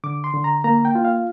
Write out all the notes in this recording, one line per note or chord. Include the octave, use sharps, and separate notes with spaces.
D3 D6
C6
D3
A#5
A#3 A#5
G5
F4
F5